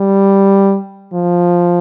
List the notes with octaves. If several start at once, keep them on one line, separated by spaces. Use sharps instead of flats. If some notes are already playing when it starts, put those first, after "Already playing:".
Already playing: G3
F3